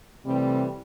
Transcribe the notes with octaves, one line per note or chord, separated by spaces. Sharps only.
C3 E3 G3 A3 C4